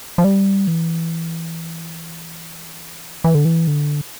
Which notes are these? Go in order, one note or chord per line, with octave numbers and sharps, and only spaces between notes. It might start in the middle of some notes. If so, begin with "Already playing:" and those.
F3
G3
E3
E3
D3
E3
D3